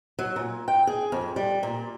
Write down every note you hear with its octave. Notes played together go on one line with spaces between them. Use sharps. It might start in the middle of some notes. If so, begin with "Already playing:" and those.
F#3
A#2
G5
G#4
F2
G3
A#2